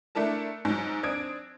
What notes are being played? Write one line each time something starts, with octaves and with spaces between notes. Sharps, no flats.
A3 D4 E4 A#4 A5
G#2 F#3
C4 D4 D#6 G#6 D7